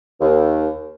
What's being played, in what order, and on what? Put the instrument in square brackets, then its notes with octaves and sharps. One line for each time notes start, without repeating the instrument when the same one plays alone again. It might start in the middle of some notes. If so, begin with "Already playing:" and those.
[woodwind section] D#2